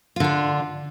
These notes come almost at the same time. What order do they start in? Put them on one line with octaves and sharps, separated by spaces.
F4 D3 D4